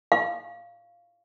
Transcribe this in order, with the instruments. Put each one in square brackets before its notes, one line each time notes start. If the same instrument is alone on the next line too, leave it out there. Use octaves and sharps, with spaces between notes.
[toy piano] F5